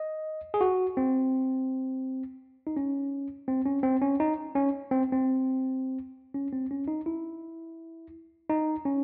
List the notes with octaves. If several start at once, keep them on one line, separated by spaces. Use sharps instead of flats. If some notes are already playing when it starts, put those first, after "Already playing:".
Already playing: D#5
G#4
F#4
C4
D#4
C#4
C4
C#4
C4
C#4
D#4
C#4
C4
C4
C#4
C4
C#4
D#4
E4
D#4
C#4